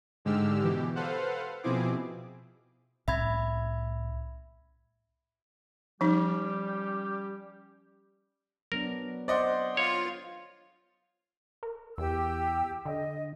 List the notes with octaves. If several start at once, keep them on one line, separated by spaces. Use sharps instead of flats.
G#2 D3 G#3 G4 E6 F6
B2 E3 G4
A4 B4 C5 F5 F#5
B2 F3 C4 E4 G#4 D6
C2 A2 C#4 E5 B5 G#6
F3 G3 C#4 D#4 G4
F#3 B3 D4 A#4
C5 D5 D#5 F#5
F4 C#5
A#4
E2 G4 G5 E6
D3 D#5